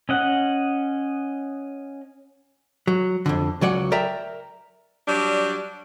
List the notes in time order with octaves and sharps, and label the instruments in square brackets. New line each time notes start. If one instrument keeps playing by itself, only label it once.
[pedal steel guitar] C#4 D#5 F#5
[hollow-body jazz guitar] F#3
F2 G#2 D3
C#2 F#3 D5 F#5
A#4 D5 E5 G5 A#5
[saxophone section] F#3 G3 D4